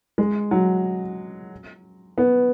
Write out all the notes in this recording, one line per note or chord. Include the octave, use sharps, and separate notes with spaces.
G#3
F#3
B3